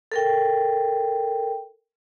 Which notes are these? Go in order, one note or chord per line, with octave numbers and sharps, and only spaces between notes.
A4 A#4 G5